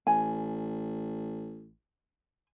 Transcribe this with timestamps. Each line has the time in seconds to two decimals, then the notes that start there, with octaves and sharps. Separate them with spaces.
0.07 A1 G#5